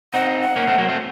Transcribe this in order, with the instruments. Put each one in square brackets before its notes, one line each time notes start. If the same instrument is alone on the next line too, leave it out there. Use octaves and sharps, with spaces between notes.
[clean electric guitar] C4 D#4 [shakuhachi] F#5
[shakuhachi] F5
F#5
[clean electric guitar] A#3 C#4
A3 C4
F#3 A#3
A3 C4